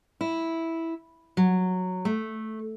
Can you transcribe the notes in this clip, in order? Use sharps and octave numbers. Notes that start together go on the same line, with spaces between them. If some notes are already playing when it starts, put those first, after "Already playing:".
E4
F#3
A3